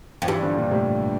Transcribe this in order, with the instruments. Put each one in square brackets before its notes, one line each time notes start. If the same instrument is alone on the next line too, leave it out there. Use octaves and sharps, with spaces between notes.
[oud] F2 [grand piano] F3
[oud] G2 [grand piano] E3 G3
[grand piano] D3 F3
A#2 D3
A2 C3